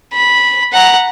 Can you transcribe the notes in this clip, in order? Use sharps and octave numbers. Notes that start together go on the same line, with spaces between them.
B5
F#5 A#5